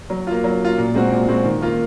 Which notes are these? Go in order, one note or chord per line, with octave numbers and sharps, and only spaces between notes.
F#3
A#3 F4
F#3
A#3 F4
A#2
G#3 C4 F#4
A#2
G#3 C4 F#4
D#3
A#3 F4